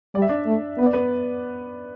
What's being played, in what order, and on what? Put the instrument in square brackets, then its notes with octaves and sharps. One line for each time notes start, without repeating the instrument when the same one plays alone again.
[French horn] G3 [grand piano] D5
[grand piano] E5
D4 D5
[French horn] A3
[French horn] B3 [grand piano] B4
[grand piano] D5
B3 B4